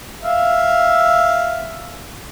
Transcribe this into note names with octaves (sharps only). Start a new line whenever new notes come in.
E5 F5